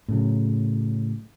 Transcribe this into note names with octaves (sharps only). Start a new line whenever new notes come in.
A2 C#3 F#3